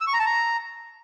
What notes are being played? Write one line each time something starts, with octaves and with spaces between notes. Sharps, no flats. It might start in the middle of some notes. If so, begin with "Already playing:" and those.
E6
C#6
A#5
A5
A#5